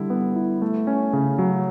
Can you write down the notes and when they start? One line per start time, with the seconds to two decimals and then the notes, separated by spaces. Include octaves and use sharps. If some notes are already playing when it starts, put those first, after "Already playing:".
Already playing: D3 G3 E4
0.10 B3
0.36 E4
0.62 A3
0.87 C#4
1.13 C#3
1.38 F#3